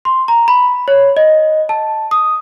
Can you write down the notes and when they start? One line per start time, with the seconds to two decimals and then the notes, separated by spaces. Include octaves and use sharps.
0.05 C6
0.28 A#5
0.48 B5
0.88 C#5
1.17 D#5
1.69 A5
2.11 D#6